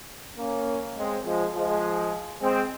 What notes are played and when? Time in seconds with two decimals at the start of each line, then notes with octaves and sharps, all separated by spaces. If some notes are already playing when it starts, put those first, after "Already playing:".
0.38 A#3 C#4
0.97 G#3 C4
1.25 F3 G#3
1.54 F3 G#3
2.41 G#3 C4